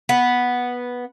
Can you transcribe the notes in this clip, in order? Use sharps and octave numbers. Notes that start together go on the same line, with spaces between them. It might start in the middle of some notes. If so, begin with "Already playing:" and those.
B3